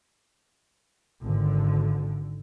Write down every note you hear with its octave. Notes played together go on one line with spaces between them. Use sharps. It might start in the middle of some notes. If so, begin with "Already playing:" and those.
G#1 D3